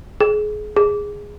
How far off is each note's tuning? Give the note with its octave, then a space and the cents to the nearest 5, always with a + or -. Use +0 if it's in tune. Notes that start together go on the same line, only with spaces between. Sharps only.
G#4 +25
G#4 -10